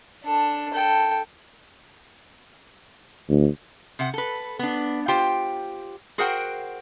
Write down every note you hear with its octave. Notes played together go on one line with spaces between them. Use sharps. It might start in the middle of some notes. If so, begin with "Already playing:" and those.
D4 A4
A4 G5
D2
C3 F#5
A4 B4
B3 D4
F4 G4 C5 G5
F#4 G#4 A#4 C5 F#5 G5